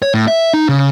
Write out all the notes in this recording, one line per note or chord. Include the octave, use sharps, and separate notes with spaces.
C#5
A2
E5
D#4
C#3